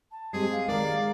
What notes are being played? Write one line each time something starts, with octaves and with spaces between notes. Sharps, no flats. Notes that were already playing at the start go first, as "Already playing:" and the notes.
A5
G#3 C4 G4 G#4
F5
D#3 G#3 A#4 D5